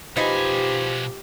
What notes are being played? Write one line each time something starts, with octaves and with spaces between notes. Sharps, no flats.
B2 F3 D#4 G4 B4 D#5 G#5